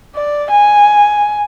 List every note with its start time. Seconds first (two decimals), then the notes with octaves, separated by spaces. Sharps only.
0.15 D5
0.50 G#5